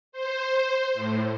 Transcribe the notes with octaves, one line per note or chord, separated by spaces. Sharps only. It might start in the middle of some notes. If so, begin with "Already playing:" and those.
C5
A2